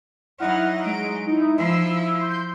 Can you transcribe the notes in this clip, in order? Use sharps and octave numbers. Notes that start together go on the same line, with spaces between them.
F#3 D#4 E4 F#5 F6
G#3 D7
D#4 E4
F3 E4 E6 C7
C6 G6